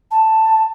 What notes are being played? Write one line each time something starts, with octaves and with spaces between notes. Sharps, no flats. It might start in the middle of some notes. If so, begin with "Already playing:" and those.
A5